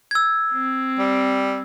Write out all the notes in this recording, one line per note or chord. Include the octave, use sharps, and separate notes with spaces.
E6 G#6
C4
G3